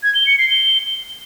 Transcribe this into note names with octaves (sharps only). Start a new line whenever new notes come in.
G#6
G7
C#7
C7
G7